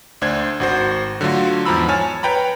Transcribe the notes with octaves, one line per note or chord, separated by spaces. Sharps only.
D2 D4 C5 G#6
G#1 F#4 C5
D3 F#3 A3 F4 F#4
E2 G#2 F3 A#5 B5 E6
C#5 G#5 A5 F6 A6
B4 C#5 G5 A#5 B5